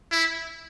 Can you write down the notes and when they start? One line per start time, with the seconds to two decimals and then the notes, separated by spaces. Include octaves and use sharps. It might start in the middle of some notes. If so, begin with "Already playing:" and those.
0.12 E4